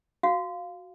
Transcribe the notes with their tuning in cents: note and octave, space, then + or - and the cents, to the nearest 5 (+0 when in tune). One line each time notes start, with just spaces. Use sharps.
F#4 -5 F5 +0